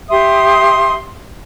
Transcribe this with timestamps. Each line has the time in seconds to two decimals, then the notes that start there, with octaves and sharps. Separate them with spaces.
0.09 G4 E5 C6 D#6